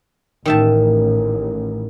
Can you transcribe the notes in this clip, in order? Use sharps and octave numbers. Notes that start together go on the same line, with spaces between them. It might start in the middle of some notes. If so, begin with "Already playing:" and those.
A1 D#3 E5 A5